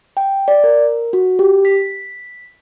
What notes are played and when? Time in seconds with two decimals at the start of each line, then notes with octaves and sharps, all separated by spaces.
0.17 G5
0.48 D5
0.64 A#4
1.13 F#4
1.39 G4
1.65 B6